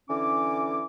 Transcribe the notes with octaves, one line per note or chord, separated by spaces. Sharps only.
D3 E3 C#4 D6